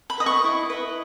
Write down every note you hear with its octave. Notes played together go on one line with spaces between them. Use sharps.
B5
B4 D#5 D#6
C#6
E4
B4 D#5